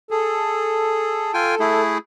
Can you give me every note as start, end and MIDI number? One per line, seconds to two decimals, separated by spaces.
0.11 1.31 68
0.11 1.82 69
1.34 1.55 65
1.34 1.55 79
1.34 1.55 80
1.60 1.98 57
1.60 1.98 64
1.60 1.98 68